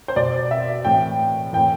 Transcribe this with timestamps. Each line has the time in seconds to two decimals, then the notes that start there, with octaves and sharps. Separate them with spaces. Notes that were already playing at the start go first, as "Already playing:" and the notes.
0.08 C5
0.16 B2 D5
0.51 E5
0.84 A2 E3 G5
1.53 A2 E3 G5